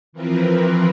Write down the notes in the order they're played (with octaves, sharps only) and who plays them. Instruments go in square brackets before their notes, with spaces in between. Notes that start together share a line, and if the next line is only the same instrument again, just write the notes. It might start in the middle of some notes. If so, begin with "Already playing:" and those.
[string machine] E3 F3 C4 A#4 B4